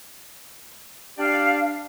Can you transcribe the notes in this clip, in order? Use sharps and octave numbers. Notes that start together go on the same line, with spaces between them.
D4 G4 D5 F5